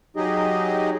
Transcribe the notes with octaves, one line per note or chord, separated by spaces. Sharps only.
F#3 D#4 G4 G#4 D#5